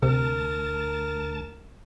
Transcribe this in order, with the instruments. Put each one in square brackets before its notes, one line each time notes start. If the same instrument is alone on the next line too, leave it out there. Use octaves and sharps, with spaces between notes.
[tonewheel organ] D2 A5 [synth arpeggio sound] C3 [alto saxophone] A#4